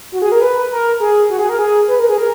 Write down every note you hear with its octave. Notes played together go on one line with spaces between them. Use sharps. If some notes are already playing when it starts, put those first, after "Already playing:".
F#4
G#4
A#4
B4
A#4
G#4
F#4
G#4
A#4
G#4
B4
A#4
G#4
A#4